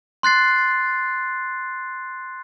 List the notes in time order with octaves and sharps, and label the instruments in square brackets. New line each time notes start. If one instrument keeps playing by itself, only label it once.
[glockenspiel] C6 F#6 A6 C7